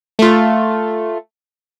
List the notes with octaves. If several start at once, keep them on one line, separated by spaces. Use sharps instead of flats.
A3 F4